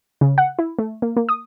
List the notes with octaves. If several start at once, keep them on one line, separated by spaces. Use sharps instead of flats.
C#3
F#5
E4
A3
A#3
A#3
D#6